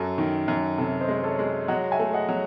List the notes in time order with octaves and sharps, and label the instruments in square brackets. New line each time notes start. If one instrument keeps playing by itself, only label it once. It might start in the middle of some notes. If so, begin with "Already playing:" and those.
Already playing: [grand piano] F#2 [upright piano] F#4 A4
[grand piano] D#3
F#2
[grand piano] C3 [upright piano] A4 C#5
[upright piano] C5 D#5
[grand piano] G#3
[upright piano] A4 C#5
[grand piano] G#3
[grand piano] F#3 [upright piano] D#5 F#5
[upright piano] E5 G#5
[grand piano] A3
[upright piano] D#5 F#5
[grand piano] F#3